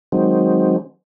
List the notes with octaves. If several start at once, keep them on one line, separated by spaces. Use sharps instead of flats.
D#3 F#3 G#3 C4